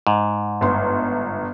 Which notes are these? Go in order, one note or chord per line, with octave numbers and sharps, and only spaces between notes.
G#2
G1 C6